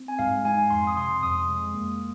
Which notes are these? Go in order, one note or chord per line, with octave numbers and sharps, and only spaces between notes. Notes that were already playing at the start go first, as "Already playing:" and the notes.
Already playing: C4
G#5
G#2 F5
G#2 G#5
F2 C6
D#6
C3 C6
F2 D#6
G#3
A#3